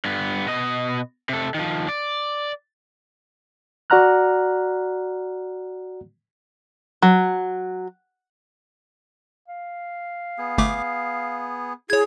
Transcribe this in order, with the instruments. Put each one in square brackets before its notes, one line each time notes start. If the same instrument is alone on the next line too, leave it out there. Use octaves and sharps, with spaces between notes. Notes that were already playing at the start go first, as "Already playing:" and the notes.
[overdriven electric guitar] G2 B3
B2 D#5
C3 A4
D#3 F3
D5
[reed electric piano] F#4 D5 F#5 A#5 F6 F#6
[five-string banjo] F#3
[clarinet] F5
[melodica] B3 G#4
[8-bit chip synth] G1 A3 D6
[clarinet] E4 [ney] G#4 [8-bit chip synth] C#5 G#6